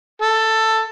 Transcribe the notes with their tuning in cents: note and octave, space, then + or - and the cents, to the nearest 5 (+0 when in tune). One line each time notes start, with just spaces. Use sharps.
A4 +10